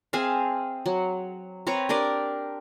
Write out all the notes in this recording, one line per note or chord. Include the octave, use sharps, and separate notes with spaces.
C4 G#4 E5 F5
F#3
C4 B4 C#5 A#5
D4 G4 A#4 D5